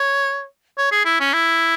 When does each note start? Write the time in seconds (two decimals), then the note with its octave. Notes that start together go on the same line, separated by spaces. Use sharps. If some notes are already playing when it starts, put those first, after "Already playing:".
Already playing: C#5
0.78 C#5
0.92 G#4
1.05 E4
1.20 C#4
1.33 E4